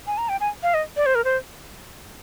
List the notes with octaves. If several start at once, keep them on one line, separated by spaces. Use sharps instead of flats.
G#5
A#5
G5
G#5
F5
D#5
D5
C5
A#4
C5